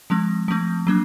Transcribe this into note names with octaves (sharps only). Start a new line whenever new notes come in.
F3 G#3 C4
F3 A3 C4
F#3 A#3 D4